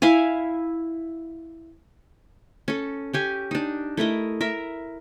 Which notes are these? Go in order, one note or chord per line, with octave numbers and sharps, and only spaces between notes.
E4 E5 F5 G#5
C#4 A4
C#4 G4 G#5
D4 D#4
A3 E4 A#4 D#5
A#4 E5